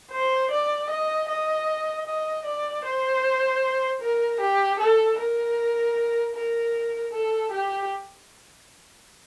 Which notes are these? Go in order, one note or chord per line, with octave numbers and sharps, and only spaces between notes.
C5
D5
D#5
D#5
D#5
D5
C5
A#4
G4
A4
A#4
A#4
A4
G4